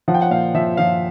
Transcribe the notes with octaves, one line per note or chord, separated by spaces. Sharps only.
F3 F#5
G5
F#5
A#2 F5
F3 E5
F3 F5